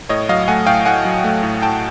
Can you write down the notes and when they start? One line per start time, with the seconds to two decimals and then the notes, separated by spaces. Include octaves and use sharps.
0.09 A2 C#5 D#5
0.29 F#3 D#5 F5
0.48 A3 F#5 G#5
0.67 A2 F5 G5
0.85 A2 F#5 G#5
1.05 F#3
1.24 A3
1.43 A2
1.62 A2 G5 A5